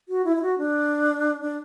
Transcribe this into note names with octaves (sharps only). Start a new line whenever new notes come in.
F#4
E4
E4
F#4
D4
D4